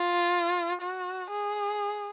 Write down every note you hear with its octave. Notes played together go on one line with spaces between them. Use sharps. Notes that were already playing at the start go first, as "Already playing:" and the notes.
Already playing: F4
F#4
G#4